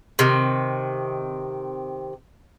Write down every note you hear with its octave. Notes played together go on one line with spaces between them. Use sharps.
C3 D#3